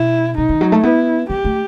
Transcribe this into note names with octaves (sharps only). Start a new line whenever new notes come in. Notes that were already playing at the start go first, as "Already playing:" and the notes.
Already playing: B2 E4
C3 D#4
D#3
F#3
A3
B3 E4
B3 G4
A3